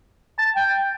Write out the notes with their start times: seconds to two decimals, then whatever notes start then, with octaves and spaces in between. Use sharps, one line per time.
0.38 A5
0.56 G5